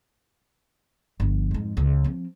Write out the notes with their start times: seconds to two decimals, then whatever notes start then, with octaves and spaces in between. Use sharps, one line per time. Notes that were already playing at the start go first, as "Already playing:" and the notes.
1.20 G1 F3
1.51 F2 G#2
1.77 C#2
2.04 F3 C4